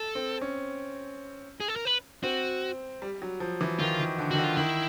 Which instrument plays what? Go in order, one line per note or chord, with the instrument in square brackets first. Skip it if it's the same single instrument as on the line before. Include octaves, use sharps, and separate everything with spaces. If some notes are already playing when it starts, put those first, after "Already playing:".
Already playing: [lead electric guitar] A4
[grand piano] C4
C#4
[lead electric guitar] G#4
A4
A#4
B4
[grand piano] C4 [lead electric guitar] F#4
[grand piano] G3
F#3
F3
E3
[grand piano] D#3 [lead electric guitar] F4
[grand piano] D#3
D3
[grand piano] D#3 [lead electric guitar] F#4
[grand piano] D3
[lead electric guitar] F4
[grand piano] D#3 [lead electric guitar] E4